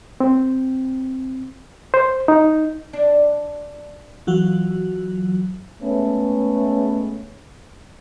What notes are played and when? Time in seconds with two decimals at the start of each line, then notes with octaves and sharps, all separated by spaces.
0.20 C4
1.94 C5
2.28 D#4
2.93 D4
4.27 E3 F#3 F4 F#4
5.82 G#3 A3 B3 C#4